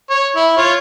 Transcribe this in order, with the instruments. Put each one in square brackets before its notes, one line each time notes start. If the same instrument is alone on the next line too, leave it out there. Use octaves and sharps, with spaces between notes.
[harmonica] C#5
E4
F4 C#5